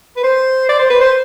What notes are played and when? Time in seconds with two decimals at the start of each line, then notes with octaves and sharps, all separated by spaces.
0.17 B4
0.24 C5
0.69 D5
0.79 C5
0.90 B4
1.01 C5